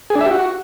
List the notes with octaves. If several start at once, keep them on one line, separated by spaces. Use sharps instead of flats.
G#4
D4
E5
G4
F#4